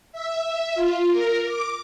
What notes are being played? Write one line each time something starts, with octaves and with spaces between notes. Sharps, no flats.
E5
F4
A#4
D6